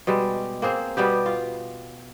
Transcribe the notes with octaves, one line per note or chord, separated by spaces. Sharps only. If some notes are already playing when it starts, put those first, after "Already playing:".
B2 G3 G#3
A#3 C4 G#4 C5
B2 G3 B3 G4
F4